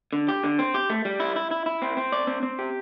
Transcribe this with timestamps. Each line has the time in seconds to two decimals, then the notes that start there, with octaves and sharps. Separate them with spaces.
0.13 D3
0.28 G4
0.44 D3
0.59 C4
0.74 G4
0.90 A3
1.05 G3
1.20 E4
1.36 E4
1.51 E4
1.66 E4
1.82 C4
1.97 C4
2.12 D5
2.27 C4
2.43 C4
2.59 G4